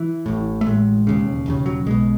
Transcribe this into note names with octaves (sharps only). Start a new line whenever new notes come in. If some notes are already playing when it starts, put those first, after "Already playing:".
Already playing: E3
A1 A2
A3
A1 A2 G#3
E1 D#2 C#3
E1 D#2 C#3
F#3
B1 B2 G#3